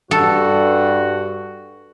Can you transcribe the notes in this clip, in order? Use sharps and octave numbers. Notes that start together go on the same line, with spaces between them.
G2 F#4 A4